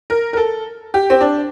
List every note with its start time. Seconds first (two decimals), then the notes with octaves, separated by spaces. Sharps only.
0.10 A#4
0.33 A#4
0.37 A4
0.94 G4
1.10 C4
1.21 D4